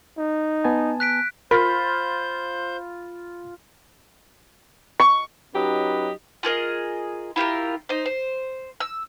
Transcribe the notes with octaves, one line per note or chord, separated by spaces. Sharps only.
D#4
B3 G#5 A5
F#6 B6 D7
F4 A#4 C5 B5 G6
C#6
F#3 C#4 D#4 G4 B4 D#5
F4 G#4 A#4 D#5
E4 F4 G4 A#4
D#4 C5
C5
E6